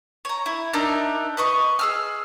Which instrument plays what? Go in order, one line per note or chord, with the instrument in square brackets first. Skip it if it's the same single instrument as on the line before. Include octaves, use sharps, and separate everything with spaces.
[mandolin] C#5 A#5
E4
D4 D#4 A#4 E5
B4 D#5 C#6
G#4 E6 F6